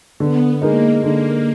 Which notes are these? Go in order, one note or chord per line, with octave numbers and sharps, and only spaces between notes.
D3 B3
G#3 A#3 D#4 A#4
D3 A#3